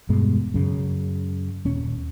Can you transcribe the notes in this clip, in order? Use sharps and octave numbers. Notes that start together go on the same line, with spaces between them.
E1 G2 B2 G#3
F#2 C#3
D#1 C#4